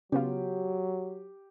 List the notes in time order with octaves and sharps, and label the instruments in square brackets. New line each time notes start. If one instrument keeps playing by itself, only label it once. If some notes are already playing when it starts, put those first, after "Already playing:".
[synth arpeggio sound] C#3 B3 F4 [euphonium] F#3 [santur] G4